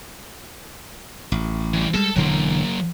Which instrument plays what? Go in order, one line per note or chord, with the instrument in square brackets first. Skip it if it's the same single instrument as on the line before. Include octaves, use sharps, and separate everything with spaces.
[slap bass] A1
[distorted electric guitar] E3 G3
[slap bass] G3 G#3 [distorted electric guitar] A4 A5
[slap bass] E1 D3 E3 [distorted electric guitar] F#3 A#3